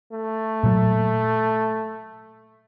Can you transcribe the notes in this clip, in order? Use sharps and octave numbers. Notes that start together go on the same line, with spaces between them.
A3
A#2 F#3